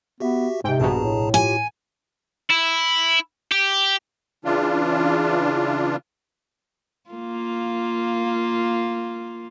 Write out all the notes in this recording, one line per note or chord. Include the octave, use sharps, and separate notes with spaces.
B3 F#4 G4 E5
G#2 C3 G5
A#1 G2 B2 G#4 A5 A#5
A2
F4 G4 G#5
E4
G4
C#3 E3 D4 F4
A#3 F4